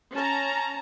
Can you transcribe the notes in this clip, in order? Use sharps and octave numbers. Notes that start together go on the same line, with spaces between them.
C#4 A5 A#5